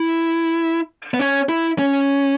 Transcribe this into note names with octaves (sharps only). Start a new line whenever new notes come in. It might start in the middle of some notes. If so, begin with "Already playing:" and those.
Already playing: E4
B3
C#4
E4
C#4